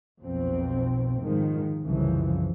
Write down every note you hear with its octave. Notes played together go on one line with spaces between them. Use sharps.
B1 F2 B2 C4
G#2 D#3 F3 G#3
C2 F#2 C#3 E3 F3